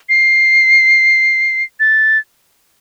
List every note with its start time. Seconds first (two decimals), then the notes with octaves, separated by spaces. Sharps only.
0.09 C7
1.80 A6